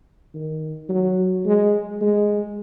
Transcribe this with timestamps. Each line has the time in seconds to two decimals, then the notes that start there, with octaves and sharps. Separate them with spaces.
0.35 D#3
0.89 F#3
1.45 G#3
2.01 G#3